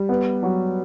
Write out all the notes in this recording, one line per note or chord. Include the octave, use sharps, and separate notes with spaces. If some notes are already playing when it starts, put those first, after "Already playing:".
Already playing: G3
B3
F#3